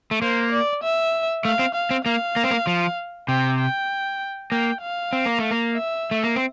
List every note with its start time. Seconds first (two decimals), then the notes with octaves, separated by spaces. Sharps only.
0.11 A3
0.22 A#3 C5
0.52 D5
0.83 E5
1.45 A3 F5
1.59 C4
1.74 F5
1.91 C4
2.06 A#3 F5
2.36 A#3
2.44 C4
2.51 A#3
2.67 F3
3.28 C3 G5
3.59 G5
4.51 A#3 G5
4.82 F5
5.13 C4
5.26 A#3
5.39 A3
5.51 A#3
5.74 E5
6.11 A3
6.24 A#3
6.36 C4